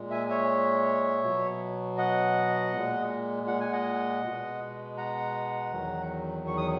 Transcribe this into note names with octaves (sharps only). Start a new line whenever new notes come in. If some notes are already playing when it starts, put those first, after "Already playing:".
Already playing: A#2 G#3
E5 G#5
C#5 E5
B2 F#3
D#5 F#5
A#2 G#3
F#5
G#5
D#5 F#5
B2 G#3
F#5 A#5
E2 D#3 F#3
C#6
D#6